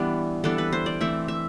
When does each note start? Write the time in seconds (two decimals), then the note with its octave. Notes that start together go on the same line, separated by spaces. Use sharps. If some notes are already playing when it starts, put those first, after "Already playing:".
Already playing: E3 G3 B3 D4
0.44 E3 G3 B3 D4 A4
0.58 B4
0.73 C5
0.86 D5
1.01 E3 A3 C4 E5
1.28 E5